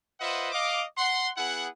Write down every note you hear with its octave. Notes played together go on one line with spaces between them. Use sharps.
F4 B4 C5 D#5 E5 F#5
D#5 F5 D6
F#5 C6
B3 E4 G#4 F#5